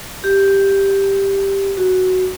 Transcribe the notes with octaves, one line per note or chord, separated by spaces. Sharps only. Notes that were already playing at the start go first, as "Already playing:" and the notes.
G4
F#4